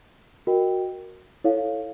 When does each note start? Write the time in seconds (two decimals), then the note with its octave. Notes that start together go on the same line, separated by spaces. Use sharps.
0.47 F#4 A#4 D#5 G5
1.44 E4 A4 C#5 F5